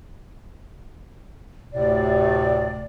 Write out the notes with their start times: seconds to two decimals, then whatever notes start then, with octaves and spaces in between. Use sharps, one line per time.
1.73 D2 A2 C3 D5